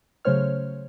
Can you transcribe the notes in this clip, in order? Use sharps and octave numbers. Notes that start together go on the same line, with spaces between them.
C#3 F#3 A3 C5 C#5 F6